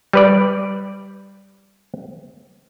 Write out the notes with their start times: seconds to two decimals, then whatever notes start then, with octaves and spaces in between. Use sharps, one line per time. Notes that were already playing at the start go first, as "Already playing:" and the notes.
0.13 G3 B4 D5